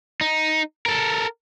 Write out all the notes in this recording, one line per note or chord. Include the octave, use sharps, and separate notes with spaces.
D#4
A4 A#4